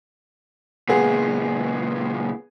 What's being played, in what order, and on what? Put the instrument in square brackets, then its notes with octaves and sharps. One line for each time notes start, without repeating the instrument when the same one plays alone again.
[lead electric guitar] C#2 A#2 [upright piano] B3 G#4